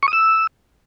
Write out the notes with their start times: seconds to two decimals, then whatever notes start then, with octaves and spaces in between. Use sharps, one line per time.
0.03 C#6
0.08 D#6
0.13 E6